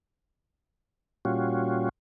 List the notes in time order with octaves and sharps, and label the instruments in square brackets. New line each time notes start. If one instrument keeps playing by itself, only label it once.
[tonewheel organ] A#2 G3 C#4 F4 F#4